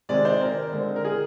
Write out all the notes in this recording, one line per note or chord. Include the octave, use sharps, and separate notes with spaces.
C3 D#3 G#3 C4 D5
C5
A#4
D3 G#3 C4
A#4
G#4